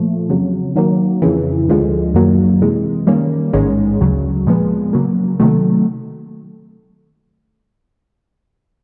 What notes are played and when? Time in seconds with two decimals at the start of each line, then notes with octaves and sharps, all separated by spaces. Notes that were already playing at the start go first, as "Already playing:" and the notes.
Already playing: A#2 F3 A3
0.30 F2 C#3 F#3
0.76 D#3 F#3 A#3
1.22 F2 C#3 E3
1.68 D2 D3 F3 G#3
2.14 F#2 D#3 F#3 A#3
2.61 C3 E3 G#3
3.07 D#3 G3 A#3 C#4
3.53 A1 G#2 D#3 G#3 C#4
4.00 D2 C#3 F#3
4.47 A#2 F3 G#3 B3
4.93 C#3 F#3 A#3
5.40 C3 D#3 F#3 A3